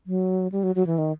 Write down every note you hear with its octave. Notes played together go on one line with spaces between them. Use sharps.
F#3
G3
F#3
F#3
E3
D#3